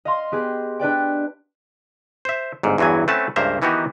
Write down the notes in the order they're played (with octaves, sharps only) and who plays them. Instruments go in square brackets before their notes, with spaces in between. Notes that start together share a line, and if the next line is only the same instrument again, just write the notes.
[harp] D#5 F5 C6
B3 G4 G#4
D4 B4 D5 G5
[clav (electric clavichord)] C5 E5
G1 G#2
E2 G2 E3 F#3 G#5
A3 C4 C#4 B4 F#5 A5
C#2 G2 A#3 C5 E5 A#5
D#3 E3 B3 D#4 F#4 G4